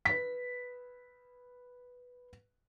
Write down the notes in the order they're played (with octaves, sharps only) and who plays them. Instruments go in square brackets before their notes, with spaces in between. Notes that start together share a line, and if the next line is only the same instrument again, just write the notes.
[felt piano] B4 B6